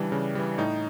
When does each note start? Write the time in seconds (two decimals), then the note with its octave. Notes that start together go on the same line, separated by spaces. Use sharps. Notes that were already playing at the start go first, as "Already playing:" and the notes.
Already playing: C#3 E3 G3 D4
0.12 C#3
0.35 E3 G3
0.58 A2 D#4